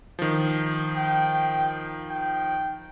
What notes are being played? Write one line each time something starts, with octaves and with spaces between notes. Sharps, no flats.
D#3 F3
G5
G5